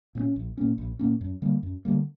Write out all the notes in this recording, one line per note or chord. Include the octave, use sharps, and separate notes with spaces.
A#2 A#3 C#4
A#1
A#2 A#3 C#4
A#1
A#2 A#3 C#4
F#2
D3 G3 A#3
F#2
D3 G3 A#3